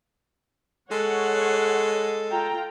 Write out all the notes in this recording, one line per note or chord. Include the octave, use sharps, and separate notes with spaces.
G#3 A4 C#5 F#5
F4 G5 A#5